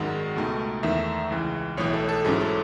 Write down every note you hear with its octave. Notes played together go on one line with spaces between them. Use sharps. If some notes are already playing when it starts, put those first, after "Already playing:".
Already playing: G#1 F#2 D#3 G#3 F#5
C#2 B2 A3 D#4
E2 D#3 A3 D#4 E5
C#2 C#3 E3
B1 A2 E3 C#5
A4
A4
A1 G#2 F#3 C#4 E4 G#4
A4